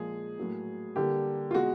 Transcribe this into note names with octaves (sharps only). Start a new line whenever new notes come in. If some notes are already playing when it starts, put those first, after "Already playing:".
Already playing: A#2 F3 G#3 G#4
A2 F#3 A#3
D3 G3 A#3 G4
F4
B2 G#3 F#4